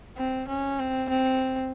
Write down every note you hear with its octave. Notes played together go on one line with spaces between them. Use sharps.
C4
C#4
C4
C4